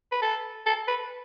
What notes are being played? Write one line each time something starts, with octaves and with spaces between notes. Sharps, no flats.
B4
A4
A4
B4